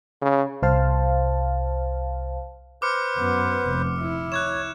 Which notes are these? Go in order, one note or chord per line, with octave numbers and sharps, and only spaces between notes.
C#3
C2 C5 F5 A5
B4 C5 D6 F6 C#7
F#2 B3
F1
E4
C#5 F#6 G#6 E7